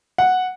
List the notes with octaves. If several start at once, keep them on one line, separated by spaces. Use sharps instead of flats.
F#5